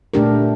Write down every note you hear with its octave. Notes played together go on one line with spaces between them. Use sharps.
A#2 A3 D4 G4 A#4